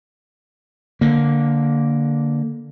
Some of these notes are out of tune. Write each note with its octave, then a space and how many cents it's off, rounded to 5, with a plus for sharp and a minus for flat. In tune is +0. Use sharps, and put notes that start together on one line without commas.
D3 -5 A#3 +0